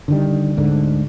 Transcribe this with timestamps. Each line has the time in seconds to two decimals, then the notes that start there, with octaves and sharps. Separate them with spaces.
0.08 D3 D#3 G3
0.57 D2 G#2 D3